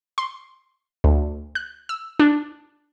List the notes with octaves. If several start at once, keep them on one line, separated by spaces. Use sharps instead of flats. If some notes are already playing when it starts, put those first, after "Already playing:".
C6
D2
F#6
E6
D4